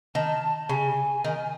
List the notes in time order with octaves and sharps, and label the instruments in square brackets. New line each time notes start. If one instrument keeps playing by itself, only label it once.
[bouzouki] D#3 [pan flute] A5
[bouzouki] C#3 [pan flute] G#5
[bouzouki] D#3